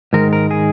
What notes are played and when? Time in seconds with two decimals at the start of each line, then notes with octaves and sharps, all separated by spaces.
0.13 G#2 D#3 G#3 A#4
0.33 A#4
0.51 G#4